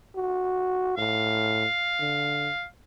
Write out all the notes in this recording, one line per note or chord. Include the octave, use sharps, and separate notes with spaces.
F#4
A2 F5
D3